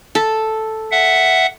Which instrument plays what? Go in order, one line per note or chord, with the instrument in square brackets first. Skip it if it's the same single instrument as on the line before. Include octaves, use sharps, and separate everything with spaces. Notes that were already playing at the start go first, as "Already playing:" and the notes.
[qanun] A4
[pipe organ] E5 F#5